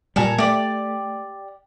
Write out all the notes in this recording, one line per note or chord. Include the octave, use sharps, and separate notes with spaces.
A#2 G3 A4 G#5 A#5
A3 G4 D5